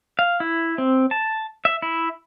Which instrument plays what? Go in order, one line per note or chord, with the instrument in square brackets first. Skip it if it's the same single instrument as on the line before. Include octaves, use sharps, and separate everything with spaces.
[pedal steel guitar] F5
E4
C4
A5
E5
E4